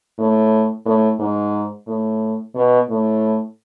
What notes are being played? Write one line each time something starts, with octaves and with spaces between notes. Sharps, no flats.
A2
A2
G#2
A2
B2
A2